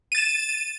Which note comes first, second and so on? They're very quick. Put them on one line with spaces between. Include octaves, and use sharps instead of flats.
D#7 A6 E7